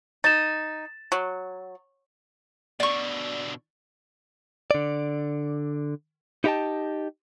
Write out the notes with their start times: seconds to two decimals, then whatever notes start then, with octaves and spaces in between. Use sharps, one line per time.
0.24 D#4 A6 E7
1.12 F#3
2.80 B2 D3 D5 C#6
4.71 D3 D5
6.44 D#4 E4 G4 D#5 G5 A5